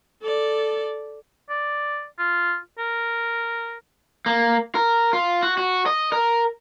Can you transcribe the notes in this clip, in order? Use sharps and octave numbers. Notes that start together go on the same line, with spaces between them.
A4 D5
D5
F4
A#4
A#3
A#4
F4
F#4
F#4
D#5
A#4